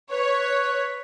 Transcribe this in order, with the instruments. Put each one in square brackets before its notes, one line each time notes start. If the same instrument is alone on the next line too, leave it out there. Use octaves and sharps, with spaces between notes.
[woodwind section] B4 [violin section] C#5